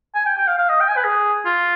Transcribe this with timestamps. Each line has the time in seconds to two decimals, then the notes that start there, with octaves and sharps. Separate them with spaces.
0.15 G#5
0.26 G5
0.37 G5
0.47 F5
0.58 F5
0.69 D#5
0.80 G5
0.89 G#5
0.97 B4
1.04 G#4
1.45 F4